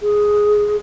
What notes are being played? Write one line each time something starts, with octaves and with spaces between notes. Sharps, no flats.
G#4